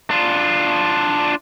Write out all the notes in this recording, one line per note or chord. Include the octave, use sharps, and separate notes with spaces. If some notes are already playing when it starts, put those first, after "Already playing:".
D4 F4